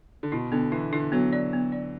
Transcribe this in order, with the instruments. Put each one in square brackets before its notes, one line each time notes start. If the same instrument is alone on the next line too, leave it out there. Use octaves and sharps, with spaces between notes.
[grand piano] D3
[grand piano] B2 [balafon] E4
[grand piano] D3 [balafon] B3
[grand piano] E3 [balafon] E4
[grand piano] D3 [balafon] E4
[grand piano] F#3 [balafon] B3
[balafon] D5
B3
D5